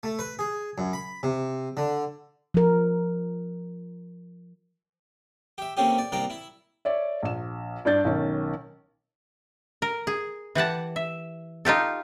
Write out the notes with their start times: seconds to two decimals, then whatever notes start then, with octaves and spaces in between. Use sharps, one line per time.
0.03 A3
0.19 B4
0.39 G#4
0.78 F#2
0.93 B5
1.23 C3
1.77 D3
2.54 F3 A#4
5.58 G4 E5
5.77 A3 A#3 C4 C#4 G4
5.98 D5
6.12 C2 A#3 G4 D5 A#5
6.30 E4
6.85 C#5 D5 E5
7.23 A#1 E7
7.85 G2 D4 D5 G6 A6
8.05 B1 D#3 C#4
9.82 A#4
10.07 G#4
10.55 E3 G4 F#5 A5
10.96 E5
11.65 D#4 F4 G4 A4